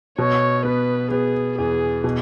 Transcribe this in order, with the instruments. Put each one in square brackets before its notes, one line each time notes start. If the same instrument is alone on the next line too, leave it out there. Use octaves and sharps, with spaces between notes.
[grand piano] B2 [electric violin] C#5
[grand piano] B3 [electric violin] B4
[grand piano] B3 [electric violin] G#4
[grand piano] E2 [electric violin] G#4
[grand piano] B2